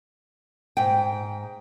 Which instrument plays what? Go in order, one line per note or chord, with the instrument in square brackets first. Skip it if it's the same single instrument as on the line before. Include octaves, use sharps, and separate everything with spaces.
[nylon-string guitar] G#2 G5